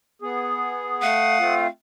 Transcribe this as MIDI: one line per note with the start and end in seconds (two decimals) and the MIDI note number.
0.22 1.02 59
0.22 1.02 68
1.02 1.39 57
1.02 1.68 77
1.02 1.55 78
1.02 1.55 87
1.39 1.67 57
1.39 1.67 60
1.39 1.67 65